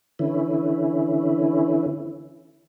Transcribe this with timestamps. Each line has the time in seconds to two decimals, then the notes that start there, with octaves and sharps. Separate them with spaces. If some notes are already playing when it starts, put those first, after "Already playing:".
0.19 D3 E3 C#4 E4